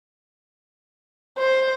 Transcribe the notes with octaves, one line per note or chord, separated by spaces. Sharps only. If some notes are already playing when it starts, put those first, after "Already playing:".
C5